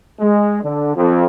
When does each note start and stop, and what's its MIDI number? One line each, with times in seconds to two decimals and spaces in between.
0.19 0.62 56
0.63 0.92 50
0.95 1.26 41